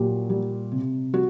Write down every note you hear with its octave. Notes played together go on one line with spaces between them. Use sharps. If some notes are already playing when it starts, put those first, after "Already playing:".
Already playing: A#2 F#3 G4
G3
C3
G3 F#4